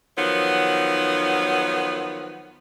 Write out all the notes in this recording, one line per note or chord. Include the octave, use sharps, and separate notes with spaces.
D#3 F3 F#3 B3